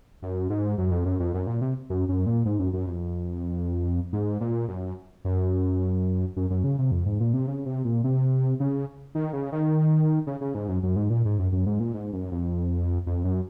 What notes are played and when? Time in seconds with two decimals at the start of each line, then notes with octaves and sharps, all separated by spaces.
0.22 F#2
0.50 G#2
0.78 F#2
0.91 F2
1.05 F#2
1.20 F2
1.34 F#2
1.47 A#2
1.61 C3
1.90 F#2
2.09 F#2
2.26 A#2
2.45 G#2
2.59 F#2
2.73 F#2
2.87 F2
4.13 G#2
4.41 A#2
4.68 F#2
5.25 F#2
6.36 F#2
6.50 F#2
6.64 C#3
6.78 C3
6.91 F2
7.06 G#2
7.20 A#2
7.33 C3
7.47 C#3
7.66 C3
7.85 A#2
8.04 C3
8.60 C#3
9.15 D#3
9.33 C#3
9.52 D#3
10.27 C#3
10.41 C#3
10.55 G#2
10.68 F#2
10.83 F#2
10.96 G#2
11.10 A#2
11.25 G#2
11.39 F#2
11.52 F#2
11.66 G#2
11.80 A#2
11.94 G#2
12.13 F#2
12.32 F2
13.06 F2
13.24 F#2